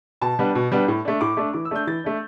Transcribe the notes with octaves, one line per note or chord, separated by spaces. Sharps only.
B2 A5
G3 B3 D4
B2
G3 B3 D4
A2
A3 D4
A2 D6
A3 D4
E3 D6
E6
A3 D4 G6
E3 A6
A3 D4